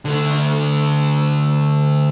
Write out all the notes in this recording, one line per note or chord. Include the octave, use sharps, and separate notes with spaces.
D3 A3